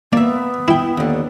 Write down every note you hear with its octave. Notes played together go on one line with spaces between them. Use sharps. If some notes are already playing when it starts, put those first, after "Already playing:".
A#3 B3 D5 E5
E4 E5 G5
D#2 D3